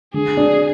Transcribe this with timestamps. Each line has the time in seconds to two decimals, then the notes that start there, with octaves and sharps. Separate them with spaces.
0.14 D3 G#4
0.37 D4